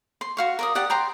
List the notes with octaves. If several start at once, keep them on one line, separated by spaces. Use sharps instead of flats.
C6
F#4 F5 C#6
A#4 D5 D#6
G4 D5 F#5 D#6
G5 A#5 C6